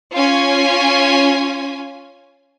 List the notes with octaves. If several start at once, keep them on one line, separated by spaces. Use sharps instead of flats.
C#4 F4 G#5